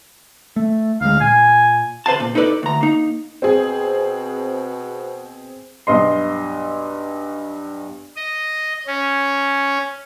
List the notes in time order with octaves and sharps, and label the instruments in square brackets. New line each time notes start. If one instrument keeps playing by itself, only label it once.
[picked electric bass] A3
[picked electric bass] D2 G#3 [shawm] F5
[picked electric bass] A#2 [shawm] G#5
[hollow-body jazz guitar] C#3 B4 C5 F5 A5
A#2
D#4 E4 A4 B4 D5
D2 A#5
A#3 D#4
[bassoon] B2 [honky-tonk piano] C4 G#4
[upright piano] B1 G2 D#5 C6
[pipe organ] D#5
C#4